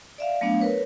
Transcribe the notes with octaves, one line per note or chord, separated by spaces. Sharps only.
D5 E5 F5
F#3 A3 B3 D4 F5
A#4 B4 C#5